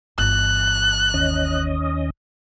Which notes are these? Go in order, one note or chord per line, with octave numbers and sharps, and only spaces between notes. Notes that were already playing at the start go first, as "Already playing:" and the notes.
G1 E3 F#6
D#2 C#4 D#5